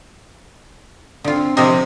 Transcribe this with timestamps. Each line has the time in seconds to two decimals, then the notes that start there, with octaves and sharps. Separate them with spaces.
1.24 D3 C4 F4
1.57 C3 F3 A#3 C5 D#5